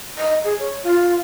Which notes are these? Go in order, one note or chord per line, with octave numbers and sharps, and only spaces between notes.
D#5
G#4
C#5
F4